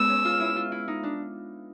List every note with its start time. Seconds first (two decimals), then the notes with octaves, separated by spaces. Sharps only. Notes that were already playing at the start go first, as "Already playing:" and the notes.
Already playing: G#3 B3 E6
0.09 C#4
0.25 F4
0.40 E4
0.56 F4
0.72 E4
0.88 D#4
1.03 D4